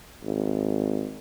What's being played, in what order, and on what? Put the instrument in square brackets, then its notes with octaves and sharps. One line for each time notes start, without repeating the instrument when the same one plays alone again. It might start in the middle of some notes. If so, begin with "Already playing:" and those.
[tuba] G#1